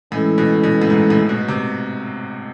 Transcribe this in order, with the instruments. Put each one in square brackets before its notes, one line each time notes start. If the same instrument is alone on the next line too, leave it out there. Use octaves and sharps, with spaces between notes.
[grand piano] A2 [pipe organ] E3 G#3 C#4 E4 A4
[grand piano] B2
B2
A2
G#2
A2
B2
C3